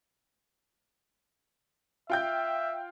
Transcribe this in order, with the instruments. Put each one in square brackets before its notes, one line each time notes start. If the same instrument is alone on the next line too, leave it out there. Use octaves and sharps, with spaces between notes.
[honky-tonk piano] F4 G5 G6 [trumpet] E5